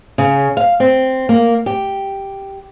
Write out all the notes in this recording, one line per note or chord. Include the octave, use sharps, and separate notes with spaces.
C#3
F5
C4
A#3
G4